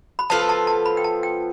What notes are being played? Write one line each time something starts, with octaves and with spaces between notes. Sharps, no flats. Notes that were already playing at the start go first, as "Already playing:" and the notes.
B5
F3 B3 F4 A4 A5
A5
A5
B5
G5
A5
G5